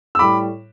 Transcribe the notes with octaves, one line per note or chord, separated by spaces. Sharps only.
E6
A2 G3 B5 D6